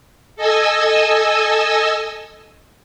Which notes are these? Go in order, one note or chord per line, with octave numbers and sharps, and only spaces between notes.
A4 D#5 G#5 E6